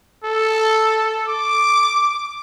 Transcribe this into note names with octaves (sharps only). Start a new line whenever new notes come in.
A4
D6